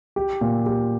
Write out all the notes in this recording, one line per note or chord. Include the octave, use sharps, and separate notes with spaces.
G4
A#2
G4